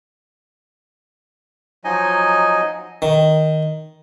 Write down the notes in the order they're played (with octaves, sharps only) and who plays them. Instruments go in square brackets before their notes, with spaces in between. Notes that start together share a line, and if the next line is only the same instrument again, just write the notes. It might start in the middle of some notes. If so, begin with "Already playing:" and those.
[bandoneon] F3 F#3 D#4 D#5 G#5
[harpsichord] D#3